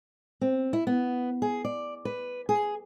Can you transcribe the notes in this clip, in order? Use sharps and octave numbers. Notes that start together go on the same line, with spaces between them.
C4
E4
B3
G#4
D5
B4
G#4